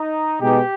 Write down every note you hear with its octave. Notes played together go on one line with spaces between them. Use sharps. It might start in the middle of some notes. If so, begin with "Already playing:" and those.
Already playing: D#4
B2 G#3 B3 D#4 G4